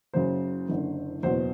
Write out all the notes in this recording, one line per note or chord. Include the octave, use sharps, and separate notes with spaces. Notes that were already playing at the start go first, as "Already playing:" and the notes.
F#1 F#2 C#3 F#3 C5
F#1 F#2 D3
F#1 E2 B2 F#3 C5